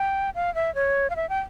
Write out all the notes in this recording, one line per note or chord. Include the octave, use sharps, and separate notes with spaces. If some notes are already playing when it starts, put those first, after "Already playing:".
Already playing: G5
F5
E5
C#5
F5
E5
G5